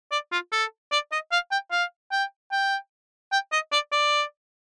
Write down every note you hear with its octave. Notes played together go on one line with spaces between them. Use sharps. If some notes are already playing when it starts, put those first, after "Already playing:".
D5
F4
A4
D5
D#5
F5
G5
F5
G5
G5
G5
D#5
D5
D5